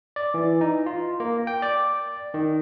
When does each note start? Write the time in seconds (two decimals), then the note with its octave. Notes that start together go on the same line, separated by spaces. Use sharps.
0.16 D5
0.34 E3
0.61 D#4
0.86 F4
1.20 A#3
1.47 G5
1.62 D5
2.34 D#3